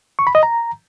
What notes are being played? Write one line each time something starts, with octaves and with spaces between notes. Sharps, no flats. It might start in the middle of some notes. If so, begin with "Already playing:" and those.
C#6
B5
D#5
A#5